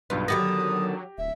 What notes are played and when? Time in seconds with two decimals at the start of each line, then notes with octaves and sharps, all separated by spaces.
0.10 B1 G2 F4 B4
0.28 D3 D#3 F#3 B3 G4 D#6 A#6
1.18 D1 E5